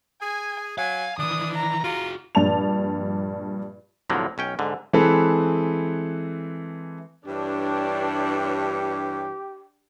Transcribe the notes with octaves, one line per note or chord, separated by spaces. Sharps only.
G#4 G#5
F#3 F5 G#5
D#3 E3 D4 D#6
A#5
F4 F#4 G#4
A#1 G2 D5 A5 F7
C2 A2 D3 F3 F#3 A#3
B1 C#4 G5
G#2 D3
E3 G#3 C4 G#4 A4 B4
G2 E3 D4 G4 C#5